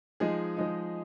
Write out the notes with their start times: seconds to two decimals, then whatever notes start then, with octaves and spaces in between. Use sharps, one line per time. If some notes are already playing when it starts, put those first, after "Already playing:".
0.20 F3 G#3 D#4 G#4
0.57 F3 G#3 D#4